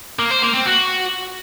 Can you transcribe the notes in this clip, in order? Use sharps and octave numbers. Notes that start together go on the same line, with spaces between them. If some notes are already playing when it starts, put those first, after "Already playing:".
A#3
C5
A#3
C4
F#4